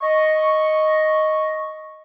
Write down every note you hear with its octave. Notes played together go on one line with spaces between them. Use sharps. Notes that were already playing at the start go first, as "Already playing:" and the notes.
D#5 C#6